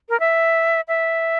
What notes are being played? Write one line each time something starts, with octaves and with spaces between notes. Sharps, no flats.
A#4
E5
E5